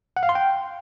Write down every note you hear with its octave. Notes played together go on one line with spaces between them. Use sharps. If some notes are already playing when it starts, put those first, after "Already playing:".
F#5
F5
C6
G5